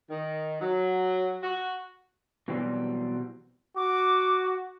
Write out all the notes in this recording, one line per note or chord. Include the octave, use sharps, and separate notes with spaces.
D#3
F#3
F#4
B2 E3 F#3 G3 C4
F#4 D6